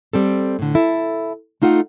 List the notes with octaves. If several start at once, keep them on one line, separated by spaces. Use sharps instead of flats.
G3 C4 A4
A2 D3
E4 A4
A3 D#4 F4 A4 F#5